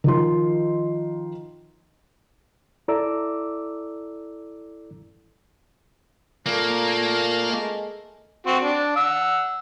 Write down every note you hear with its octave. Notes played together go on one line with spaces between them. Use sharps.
D#3 F3 C6
E4 A4 D5 A#5 D6 E6
A#2 A3 A#3 A#4
G#3
C4 F#4
D4
F#5 E6